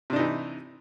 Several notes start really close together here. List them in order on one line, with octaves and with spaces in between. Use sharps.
C3 D4 D#4 E3